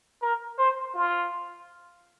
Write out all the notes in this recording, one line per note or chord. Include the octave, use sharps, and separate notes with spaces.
A#4
C5
F4